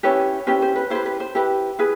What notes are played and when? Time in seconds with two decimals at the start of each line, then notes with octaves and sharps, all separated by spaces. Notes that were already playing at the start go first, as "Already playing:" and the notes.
0.03 C#4 E4 G4 B4 C#5
0.47 C#4 E4 G4 B4 C5
0.62 C5
0.76 B4
0.90 E4 G4 B4 C5
1.06 B4
1.20 C5
1.35 E4 G4 B4
1.79 E4 G#4 B4